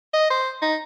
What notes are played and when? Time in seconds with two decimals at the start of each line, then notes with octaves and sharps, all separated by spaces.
0.13 D#5
0.30 C5
0.62 D#4